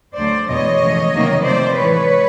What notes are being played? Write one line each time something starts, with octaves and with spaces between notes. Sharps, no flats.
D2 D3 F#3 A3 C5 D5
E2 B2 G#3 C#5 D#5
F2 C#3 E3 A3
C3 D#3 F#3 A#3
C3 F3 A3 C4 C5 D5
A2 E3 G#3 B4 C#5